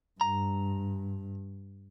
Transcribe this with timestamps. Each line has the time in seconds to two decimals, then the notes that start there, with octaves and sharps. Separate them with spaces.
0.21 G2 A#5